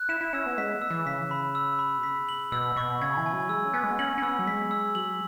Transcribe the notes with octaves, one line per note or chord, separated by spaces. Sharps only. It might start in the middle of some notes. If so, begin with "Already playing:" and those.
Already playing: F#6
E4 E7
E4
C#4 E6
B3
G#3 B6
E6
E3
C#3 B6
B5
E6
B5
B2
C#3 B6
F#7
B2 E6
B2 C#6
C#3 G#6
E3
G#5
F#3
G#3 E6
C#4
B3 G#5
G#3
B3
C#4 F#7
C#4
B3 E6
F#3
G#3 B6
E6
F#3 F#7